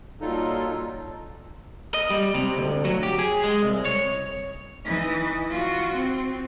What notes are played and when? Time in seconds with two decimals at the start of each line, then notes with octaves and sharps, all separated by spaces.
0.21 A#2 F#3 G3 D#4 F4 A4
1.94 D#5
2.10 G3
2.35 C3
2.58 D2
2.85 F#3
3.03 G4
3.19 G#4
3.44 G#3
3.61 C2
3.85 C#5
4.85 E3 D#4
5.50 F4 F#4
5.93 C4